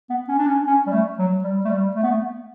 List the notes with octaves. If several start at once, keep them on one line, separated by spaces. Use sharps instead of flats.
B3
C#4
D4
C#4
C#4
G3
A3
F#3
G3
A3
G3
A3
B3
A3